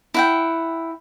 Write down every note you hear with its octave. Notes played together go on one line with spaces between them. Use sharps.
E4 F#5 G5